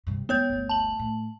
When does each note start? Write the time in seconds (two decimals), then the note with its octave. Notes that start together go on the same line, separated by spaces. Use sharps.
0.07 G2 C3
0.29 G3 G#3 B3 C#5 G6
0.50 G1 D2
0.69 A5 F#7
0.99 A2